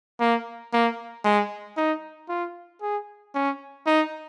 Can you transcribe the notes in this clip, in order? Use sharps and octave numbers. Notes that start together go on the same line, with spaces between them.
A#3
A#3
G#3
D#4
F4
G#4
C#4
D#4